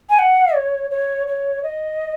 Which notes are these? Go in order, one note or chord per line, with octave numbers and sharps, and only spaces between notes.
G#5
F#5
C#5
C#5
C#5
D#5